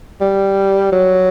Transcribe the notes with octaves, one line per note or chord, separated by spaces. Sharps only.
G3
F#3